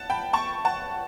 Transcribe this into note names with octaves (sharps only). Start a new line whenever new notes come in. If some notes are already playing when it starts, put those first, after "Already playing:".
Already playing: F#5 A5
G5 B5
A5 C#6
F#5 A5